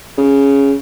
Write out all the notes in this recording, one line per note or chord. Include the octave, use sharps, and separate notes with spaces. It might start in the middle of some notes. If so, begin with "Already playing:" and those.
C#3